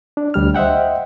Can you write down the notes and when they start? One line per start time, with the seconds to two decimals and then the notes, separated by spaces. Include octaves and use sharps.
0.17 D4
0.34 D2 G3 F6
0.55 C5 D#5 E5 F#5 G5